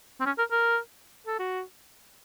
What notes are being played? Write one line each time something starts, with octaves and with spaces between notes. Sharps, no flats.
C4
C#4
A#4
A#4
A4
F#4